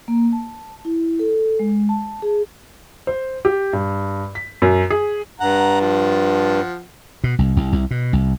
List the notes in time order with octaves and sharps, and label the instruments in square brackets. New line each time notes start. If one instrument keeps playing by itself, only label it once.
[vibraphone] A#3
A5
E4
A4
G#3
A5
G#4
[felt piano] C5
G4
G2
B6
F#2
G#4
[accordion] G2 [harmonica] F#5 A#5
[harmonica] F3 F#5
[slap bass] B2
C2
C2
C2
B2
C2